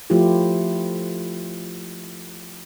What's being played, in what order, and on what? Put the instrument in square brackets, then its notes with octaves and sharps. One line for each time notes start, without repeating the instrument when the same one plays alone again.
[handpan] F3 A3 E4 F4 G4